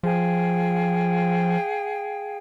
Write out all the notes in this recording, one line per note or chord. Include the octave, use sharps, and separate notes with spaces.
F3 G#4 F5 G5